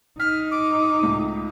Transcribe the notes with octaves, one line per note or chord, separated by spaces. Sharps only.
D#4 F6 B6
D6
C#2 A2